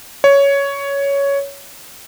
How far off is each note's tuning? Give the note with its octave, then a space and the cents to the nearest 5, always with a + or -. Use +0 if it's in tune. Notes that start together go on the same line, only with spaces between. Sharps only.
C#5 +10